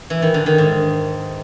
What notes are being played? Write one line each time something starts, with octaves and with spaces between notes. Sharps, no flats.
E3
D#3
D3
D#3
G#2